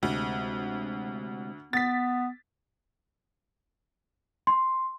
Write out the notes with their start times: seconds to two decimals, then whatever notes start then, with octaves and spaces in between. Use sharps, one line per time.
0.03 D2 C3 G#3
1.73 B3 A6 B6
4.47 C6